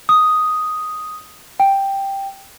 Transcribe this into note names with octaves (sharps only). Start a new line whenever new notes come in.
D#6
G5